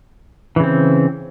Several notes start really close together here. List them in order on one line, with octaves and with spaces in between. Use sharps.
E3 C#3 C4